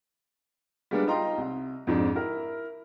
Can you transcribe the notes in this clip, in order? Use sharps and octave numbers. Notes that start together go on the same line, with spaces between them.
G3 G#3 A#3 B3 D4
D#4 F4 D#5 G5 A#5 C6
C2
F2 G#2 D4
E4 A#4